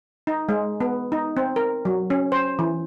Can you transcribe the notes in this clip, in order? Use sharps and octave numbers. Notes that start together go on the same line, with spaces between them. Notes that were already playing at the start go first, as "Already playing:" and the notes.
D#4
G#3
B3
D#4
C4
A#4
F#3
C#4
C5
E3